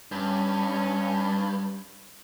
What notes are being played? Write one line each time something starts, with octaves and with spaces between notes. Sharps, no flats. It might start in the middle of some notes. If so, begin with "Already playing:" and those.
G2 C#4